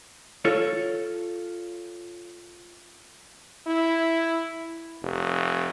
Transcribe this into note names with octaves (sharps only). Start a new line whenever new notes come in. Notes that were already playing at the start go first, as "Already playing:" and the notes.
F4 A4 C#5
E4
F1